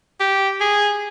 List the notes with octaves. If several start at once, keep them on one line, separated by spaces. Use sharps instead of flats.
G4
G#4